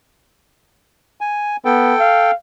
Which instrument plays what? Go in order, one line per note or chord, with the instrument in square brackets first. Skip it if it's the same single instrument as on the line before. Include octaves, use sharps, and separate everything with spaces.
[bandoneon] G#5
[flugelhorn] B3 [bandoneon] A4 G5
[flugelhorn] F5